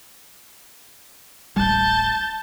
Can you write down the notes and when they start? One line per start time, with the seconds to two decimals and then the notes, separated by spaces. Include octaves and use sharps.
1.56 D1 A1 G3 A5 G6